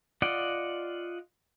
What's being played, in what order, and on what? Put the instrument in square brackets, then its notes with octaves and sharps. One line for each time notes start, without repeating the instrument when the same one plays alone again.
[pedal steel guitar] F4 D5 D#5 F#5